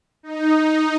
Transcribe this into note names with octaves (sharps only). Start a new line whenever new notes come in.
D#4